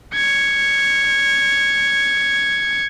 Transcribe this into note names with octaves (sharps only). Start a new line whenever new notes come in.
G#6 C#7